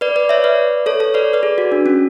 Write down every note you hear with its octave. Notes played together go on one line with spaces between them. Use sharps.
B4 D5
B4 D5
C#5 E5
B4 D5
A4 C#5
A4 C#5
B4 D5
B4 D5
G#4
F#4
D4
C#4